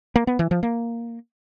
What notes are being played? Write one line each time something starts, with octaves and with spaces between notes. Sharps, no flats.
A#3
B3
E3
F3
A#3